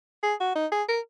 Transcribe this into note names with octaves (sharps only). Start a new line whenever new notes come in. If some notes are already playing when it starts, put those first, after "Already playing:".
G#4
F#4
D#4
G#4
A#4